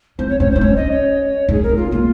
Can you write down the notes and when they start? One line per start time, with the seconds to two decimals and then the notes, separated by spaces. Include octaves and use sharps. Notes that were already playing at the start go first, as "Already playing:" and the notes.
0.19 C4 C5
0.29 C#5
0.40 C#4 C#5
0.51 D#4 C5
0.61 C#4 C#5
0.77 D#5
0.91 C#5
1.48 D#4 G#4
1.63 A#4
1.69 C#4
1.77 F4
1.92 A#3 F4